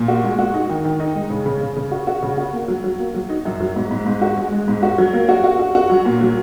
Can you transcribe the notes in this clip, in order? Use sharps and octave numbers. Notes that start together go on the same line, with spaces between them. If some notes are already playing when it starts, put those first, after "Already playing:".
Already playing: A#2
F#4
G#3
F#4
D#4
D#3
D#3
D#4
G#3
C#3
C#3
C#3
C#3
F#4
F#4
C#3
F#4
A#3
F#3
F#3
A#3
F#3
D#4
F#2
F#3
G#2
G#2
G#2
F#4
G#3
G#3
G#2
F#4
F#3
A#3
F#4
F#4
F#4
F#4
F#3
A#2
F#3